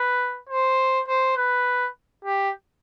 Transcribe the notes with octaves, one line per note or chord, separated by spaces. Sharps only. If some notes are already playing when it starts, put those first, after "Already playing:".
Already playing: B4
C5
C5
B4
G4